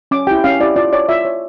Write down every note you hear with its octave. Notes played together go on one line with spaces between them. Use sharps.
C#4 D6
E4 G4 G5
C#4 F5
E4 G4 D5
F4 D5
C#5 D5
F4 E5
C#5